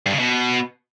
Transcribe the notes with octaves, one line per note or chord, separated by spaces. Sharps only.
G2
C#3
B2